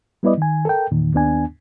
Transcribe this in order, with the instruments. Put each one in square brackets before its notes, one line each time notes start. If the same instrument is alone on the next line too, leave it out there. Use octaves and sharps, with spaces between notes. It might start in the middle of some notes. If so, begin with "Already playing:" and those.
[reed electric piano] G3 B3 E4 B4 D5 D#5
D#3 G#5
A4 A#4 G5
E2 A#2 D#3
D#2 B3 D4 G#5